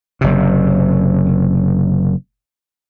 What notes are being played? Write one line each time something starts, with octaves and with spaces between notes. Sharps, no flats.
F#1 C3